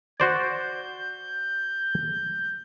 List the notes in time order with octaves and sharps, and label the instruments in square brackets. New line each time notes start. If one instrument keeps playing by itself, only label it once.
[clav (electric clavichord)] F#4 C5 D5 [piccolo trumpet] G6